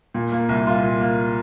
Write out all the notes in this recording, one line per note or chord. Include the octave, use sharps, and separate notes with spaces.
A#2
A#3
C2
F4
A#2
A#3